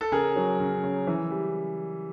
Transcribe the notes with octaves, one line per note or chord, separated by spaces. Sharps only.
A4
C#3 G#4 A#4
F#3
C#3
C#3
E3
G3